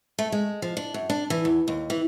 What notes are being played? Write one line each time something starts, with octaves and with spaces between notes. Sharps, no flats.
A3
G#3
F3
D4
F#2
D4
E3
E2
D#2
E3